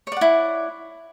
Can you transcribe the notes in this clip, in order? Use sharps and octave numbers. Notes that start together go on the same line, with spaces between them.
E4 C#5 D5 F#5